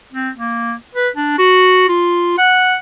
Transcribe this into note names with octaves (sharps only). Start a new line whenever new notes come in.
C4
A#3
B4
D4
F#4
F4
F#5